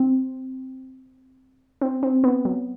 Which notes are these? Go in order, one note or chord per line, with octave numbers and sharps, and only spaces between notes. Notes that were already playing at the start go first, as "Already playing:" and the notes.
Already playing: C4
C4
C4
B3
F#3